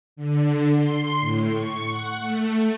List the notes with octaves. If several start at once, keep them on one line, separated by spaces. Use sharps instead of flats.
D3
C6
A2
C#6
F#5
A3